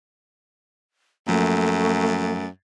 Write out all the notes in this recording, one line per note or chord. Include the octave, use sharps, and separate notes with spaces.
F#2 F3 A3 A#3